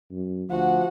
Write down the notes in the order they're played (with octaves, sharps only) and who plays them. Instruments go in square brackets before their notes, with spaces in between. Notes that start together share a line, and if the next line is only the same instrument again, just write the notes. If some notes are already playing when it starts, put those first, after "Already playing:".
[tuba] F#2
[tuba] D2 [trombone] F3 [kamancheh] F#4 F#5